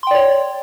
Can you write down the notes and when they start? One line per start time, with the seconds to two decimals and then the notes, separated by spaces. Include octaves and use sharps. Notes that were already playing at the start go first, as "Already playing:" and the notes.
0.03 C6
0.07 G5
0.11 D5
0.15 C#5